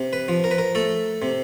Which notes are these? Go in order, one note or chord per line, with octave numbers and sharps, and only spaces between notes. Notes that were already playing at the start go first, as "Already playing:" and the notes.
Already playing: C3
B4
F3
A#4
B4
A#4
A3 A4
C3